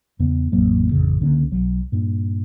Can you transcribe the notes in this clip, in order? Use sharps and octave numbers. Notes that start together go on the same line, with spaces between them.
E2 C#3 B3
A1 F2 F#3 A#3
A1 F2 G#2 C#3
C#2 D3 A#3 C#4
B1 F#3
G2 A#2